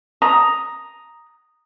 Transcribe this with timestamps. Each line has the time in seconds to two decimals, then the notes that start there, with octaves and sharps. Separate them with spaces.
0.22 A#5 D#6